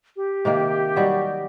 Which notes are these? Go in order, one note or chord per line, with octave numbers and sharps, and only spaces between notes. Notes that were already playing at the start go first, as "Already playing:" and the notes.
G4
C3 D#3 A#3
F#3 G3 D#4